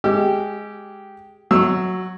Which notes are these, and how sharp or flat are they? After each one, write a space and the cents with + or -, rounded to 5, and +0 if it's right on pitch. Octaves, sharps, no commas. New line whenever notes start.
G#3 +0 G4 -10 E6 +45
F#3 +0 C#6 -25 E6 +0